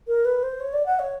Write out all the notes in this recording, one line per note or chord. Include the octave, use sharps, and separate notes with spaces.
A#4
B4
C5
C#5
D5
F#5
C#5